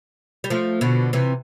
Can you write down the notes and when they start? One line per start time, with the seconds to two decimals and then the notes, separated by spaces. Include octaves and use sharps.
0.44 G3
0.50 F3 A3
0.81 B2 D3
1.13 C3 E3